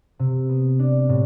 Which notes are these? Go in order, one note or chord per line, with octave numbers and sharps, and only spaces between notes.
C3
B3
D4
A2